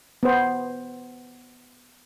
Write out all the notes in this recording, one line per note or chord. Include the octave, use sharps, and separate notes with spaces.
B3 C5